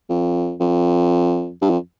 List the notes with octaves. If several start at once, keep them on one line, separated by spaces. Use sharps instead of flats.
F2
F2
G2
F2